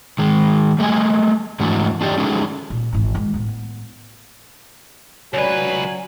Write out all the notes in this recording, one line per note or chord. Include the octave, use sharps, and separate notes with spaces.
D#3 G#3
G3 A3 D#5 G#5
G#2 E3 A3 D4 F#4
D4 F4 G4 D5 D#5
G#3 C#4 D#4 F#4 G#4 A4
A#2
G#1 E3
D#3 G#3
A2 B3
C#2 F#3 B4 C#5 D5 G#5